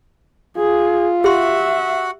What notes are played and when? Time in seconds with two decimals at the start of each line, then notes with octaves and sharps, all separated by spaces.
0.57 F4 G#4
1.24 F#4 G4 E5 F#5 C6